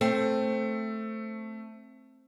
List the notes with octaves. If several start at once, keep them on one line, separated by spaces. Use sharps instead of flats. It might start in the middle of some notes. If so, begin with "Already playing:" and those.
A3 C4